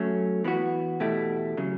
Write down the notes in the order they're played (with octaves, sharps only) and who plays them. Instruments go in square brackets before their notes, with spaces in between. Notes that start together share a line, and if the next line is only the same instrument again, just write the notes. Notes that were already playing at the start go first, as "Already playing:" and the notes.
Already playing: [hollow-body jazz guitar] F#3 A3 C#4
E3 B3 F#4
E2 B2 A3 E4 G4
C#3 F#3